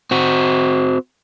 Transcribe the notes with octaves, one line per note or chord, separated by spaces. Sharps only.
C4 F#4